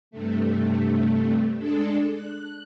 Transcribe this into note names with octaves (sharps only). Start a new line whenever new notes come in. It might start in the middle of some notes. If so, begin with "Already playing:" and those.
G2 C3 A3
G#3 D4 A4
F#6